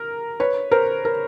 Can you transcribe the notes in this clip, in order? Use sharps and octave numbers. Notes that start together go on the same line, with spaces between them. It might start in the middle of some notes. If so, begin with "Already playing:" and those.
Already playing: A#4
B4 C#5
A#4 C5
A#4